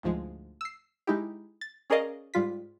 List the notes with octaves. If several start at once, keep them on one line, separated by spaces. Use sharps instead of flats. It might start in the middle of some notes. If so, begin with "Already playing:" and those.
D2 G#2 F3 G#3
E6 C7
G#3 D#4 E4 G4
A6
C#4 G#4 A#4 D5 D#5 F5
G#2 G3 F4 B6